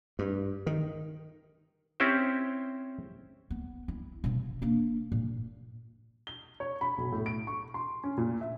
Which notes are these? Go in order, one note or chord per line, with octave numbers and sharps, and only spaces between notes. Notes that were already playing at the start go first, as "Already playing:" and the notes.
G2
D#3
C4 C#4 E4 G4 C5
B3
E4
B2 F3
A#3 D4
A#2
G7
C#5
B5
B1
A2
D7
C#6
C6
C#4
A#2
E5